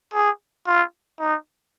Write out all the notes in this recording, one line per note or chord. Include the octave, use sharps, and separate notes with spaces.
G#4
F4
D#4